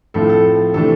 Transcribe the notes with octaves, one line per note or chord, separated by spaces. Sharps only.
A2 F3 C4 A4
A4
C3 E3 A3 D4 A4